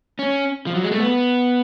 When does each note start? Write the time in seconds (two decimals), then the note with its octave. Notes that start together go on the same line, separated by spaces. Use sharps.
0.19 C#4
0.67 F3
0.75 F#3
0.84 G#3
0.92 A3
1.00 B3